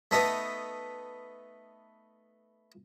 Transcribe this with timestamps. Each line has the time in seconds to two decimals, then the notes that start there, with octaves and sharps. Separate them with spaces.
0.11 A3 B3 D#4